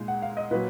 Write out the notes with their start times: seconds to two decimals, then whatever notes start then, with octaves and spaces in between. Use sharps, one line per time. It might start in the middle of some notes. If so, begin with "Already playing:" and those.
Already playing: A#2 G#3 D#4
0.08 F#5
0.22 F5
0.37 D#5
0.51 A#2 F#3 B4